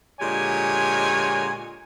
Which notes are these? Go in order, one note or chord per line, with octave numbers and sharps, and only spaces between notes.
A#2 D3 G#3 G4 C#5 G#5